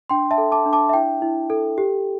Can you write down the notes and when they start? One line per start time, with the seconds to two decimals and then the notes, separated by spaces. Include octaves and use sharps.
0.10 D4 G5 C6
0.31 E5 A5
0.38 A4
0.52 A5 D6
0.66 D4
0.73 A5 D6
0.89 E5
0.93 E4 G5
1.22 E4
1.50 A4
1.78 G4